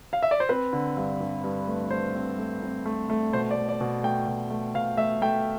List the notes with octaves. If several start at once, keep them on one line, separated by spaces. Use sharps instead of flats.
F5
E5
D5
C5
C4 B4
D3
G2
G2
G2
A3
A3 C5
C4
A3
C4
A3
A3
B2 C5
D5
A3
D5
B2
A3 G5
B2
A3
B2 F5
A3 E5
A3 G5